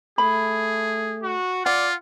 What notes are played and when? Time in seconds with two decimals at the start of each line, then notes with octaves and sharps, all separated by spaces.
0.18 A3 G#4 B5
1.23 F#4
1.66 F4 D5 F#5